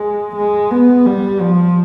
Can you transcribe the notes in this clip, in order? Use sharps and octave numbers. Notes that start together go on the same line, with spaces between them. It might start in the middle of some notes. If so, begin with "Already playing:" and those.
Already playing: G#3
G#3
B3
G3
F3